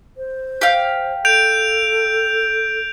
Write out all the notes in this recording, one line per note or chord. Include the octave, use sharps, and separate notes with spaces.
C5
G4 F5
A4 G6 D7 F7